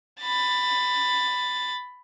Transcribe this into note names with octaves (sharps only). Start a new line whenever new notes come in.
B5 A6